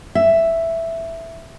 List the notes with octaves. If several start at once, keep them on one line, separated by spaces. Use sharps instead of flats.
E5